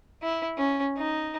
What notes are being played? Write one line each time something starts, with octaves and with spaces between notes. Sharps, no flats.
E4
C#4
D#4